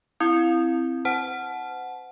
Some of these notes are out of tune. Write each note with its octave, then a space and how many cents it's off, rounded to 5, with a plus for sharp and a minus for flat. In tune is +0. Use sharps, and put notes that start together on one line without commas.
C4 +0 E4 +15
C5 -35 F#5 +0 A5 -25